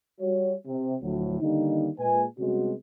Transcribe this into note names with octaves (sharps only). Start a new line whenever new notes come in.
G3 F#4 C#5
C3
D2 A2 F3 F#3
D3 D#3 G3 A#3 D#4
A#2 G#3 B4 G#5
C3 G3 G#3 B3 C#4 F#4